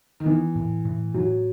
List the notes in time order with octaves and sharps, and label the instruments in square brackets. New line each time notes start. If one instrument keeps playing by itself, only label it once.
[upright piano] D#3
[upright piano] E3 [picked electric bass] B3
[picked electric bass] A2
A2
[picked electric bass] A2 [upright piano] F#3